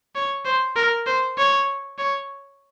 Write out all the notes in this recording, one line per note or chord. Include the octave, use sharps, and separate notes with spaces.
C#5
C5
A#4
C5
C#5
C#5